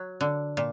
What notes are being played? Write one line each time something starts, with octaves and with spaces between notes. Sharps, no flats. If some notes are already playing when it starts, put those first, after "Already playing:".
Already playing: F#3
D3
A#2